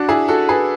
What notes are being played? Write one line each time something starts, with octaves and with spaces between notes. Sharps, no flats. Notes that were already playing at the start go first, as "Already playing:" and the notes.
Already playing: D4 F#4
E4 G#4
F#4 A4
G#4 B4